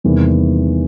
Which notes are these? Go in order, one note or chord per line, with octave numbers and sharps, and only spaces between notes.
E2 C3 D#3 G3 A#3